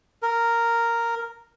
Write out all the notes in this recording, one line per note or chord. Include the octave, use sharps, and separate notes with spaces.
A#4